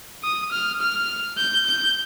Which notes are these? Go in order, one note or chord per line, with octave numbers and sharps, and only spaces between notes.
D#6
F6
F6
G6
G6